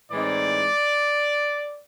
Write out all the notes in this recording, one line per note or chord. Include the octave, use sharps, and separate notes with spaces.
A2 E3 G#3 C4 D#4 D5